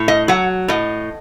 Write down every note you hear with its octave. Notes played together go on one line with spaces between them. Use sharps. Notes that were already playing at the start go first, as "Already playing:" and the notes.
Already playing: A2
D#5
F#3 F#5
A2 D#5